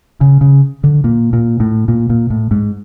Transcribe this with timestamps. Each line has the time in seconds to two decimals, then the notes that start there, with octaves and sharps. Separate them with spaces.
0.21 C#3
0.41 C#3
0.84 D3
1.04 A#2
1.33 A#2
1.60 A2
1.88 A#2
2.10 A#2
2.30 A2
2.51 G#2